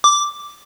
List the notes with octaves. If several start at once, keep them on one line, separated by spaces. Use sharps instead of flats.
D6